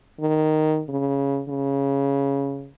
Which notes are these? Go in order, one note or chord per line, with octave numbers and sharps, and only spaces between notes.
D#3
C#3
C#3